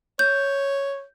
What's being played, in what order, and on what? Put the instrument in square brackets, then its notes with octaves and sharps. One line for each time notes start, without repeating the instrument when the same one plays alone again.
[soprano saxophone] C#5 [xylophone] G6